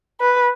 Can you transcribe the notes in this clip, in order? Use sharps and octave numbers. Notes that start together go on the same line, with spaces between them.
B4